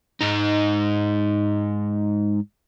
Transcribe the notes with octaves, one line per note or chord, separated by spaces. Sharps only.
G#2 D#4